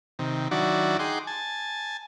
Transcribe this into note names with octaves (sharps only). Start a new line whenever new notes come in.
C3 D#3
D#3 F#3 D4 E4 F#4 D5
D#4 G#4 F#5 G5 C6 D6
G#5 A5